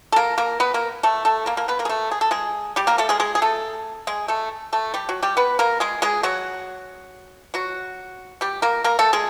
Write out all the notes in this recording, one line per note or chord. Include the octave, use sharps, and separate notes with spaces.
A4
A#3 A#4
A#3 A#4
B3 B4
A#3 A#4
A3 A4
A3 A4
A#3 A#4
A#3 A#4
B3 B4
A#3 A#4
G#4
A3 A4
G#4
A4
G#3 G#4
G3 G4
A#3 A#4
A3 A4
G#3 G#4
G#3 G#4
G#4
A3 A4
G#3 G#4
A3 A4
A3 A4
G3 G4
F#3 F#4
G3 G4
B3 B4
A#3 A#4
G#3 G#4
G#3 G#4
F#3 F#4
F#3 F#4
G3 G4
A#3 A#4
A#3 A#4
A3 A4
G#3 G#4